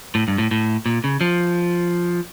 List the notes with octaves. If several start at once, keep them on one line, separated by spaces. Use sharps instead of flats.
A2
G2
A2
A2
A#2
C#3
F3